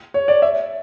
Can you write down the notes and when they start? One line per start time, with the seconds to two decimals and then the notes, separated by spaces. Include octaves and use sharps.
0.14 C#5
0.28 D5
0.42 E5